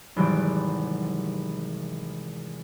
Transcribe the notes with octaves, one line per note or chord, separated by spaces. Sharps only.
G#1 C3 E3 F#3 G3 D6